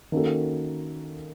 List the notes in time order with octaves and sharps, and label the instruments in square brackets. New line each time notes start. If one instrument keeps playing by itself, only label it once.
[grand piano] D#3 A#3 C#4 F#4 A4